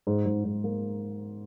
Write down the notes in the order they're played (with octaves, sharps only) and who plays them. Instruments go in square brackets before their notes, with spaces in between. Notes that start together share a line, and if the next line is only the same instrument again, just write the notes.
[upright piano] G#2
G#2
G#2
A#3